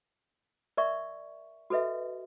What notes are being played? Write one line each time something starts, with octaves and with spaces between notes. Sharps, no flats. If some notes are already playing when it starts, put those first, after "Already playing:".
A#4 D5 E5 C#6
F#4 A4 B4 D#5 E5